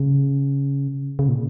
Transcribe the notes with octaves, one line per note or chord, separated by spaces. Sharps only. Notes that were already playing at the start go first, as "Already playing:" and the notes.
Already playing: C#3
C#3
A#2